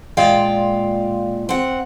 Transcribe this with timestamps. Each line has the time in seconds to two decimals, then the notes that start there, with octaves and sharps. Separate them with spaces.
0.17 A#2 G#3 F4 D5 F5 G5
1.49 C4 F#5